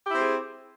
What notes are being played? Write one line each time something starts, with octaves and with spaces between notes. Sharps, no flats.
C4 E4 G4 G#4 C5